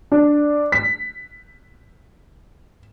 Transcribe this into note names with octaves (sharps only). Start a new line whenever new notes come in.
D4
B6